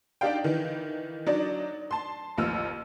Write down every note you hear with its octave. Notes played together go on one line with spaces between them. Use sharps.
D4 D#4 G4 D5 F5 G5
D#3 E3
F#3 D4 D#4 D5
A5 C6
A1 D#2 F3 E6 F6